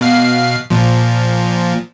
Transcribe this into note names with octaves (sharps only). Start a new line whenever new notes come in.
B2 F5 C7
A#2 F3